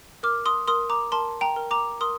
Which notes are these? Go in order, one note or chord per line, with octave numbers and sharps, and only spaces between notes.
A#4 D6 F6
C6 D#6
A#4 C6 D#6
A#5 D6
A#4 A5 C6
G5 A#5
A#4
A#5 D6
A#4 C6 D#6